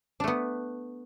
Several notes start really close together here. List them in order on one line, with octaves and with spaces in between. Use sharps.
D4 A3 B3